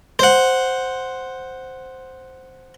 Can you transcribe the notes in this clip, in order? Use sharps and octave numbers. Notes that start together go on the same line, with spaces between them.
C5 F#5